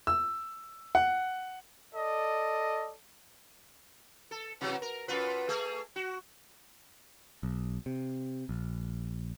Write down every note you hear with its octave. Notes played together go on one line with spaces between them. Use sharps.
E6
F#5
A4 D5 D#5
A4
C3 E3 F#3
A#4
F#2 F4 B4
A3 G#4
F#4
B1
C3
A#1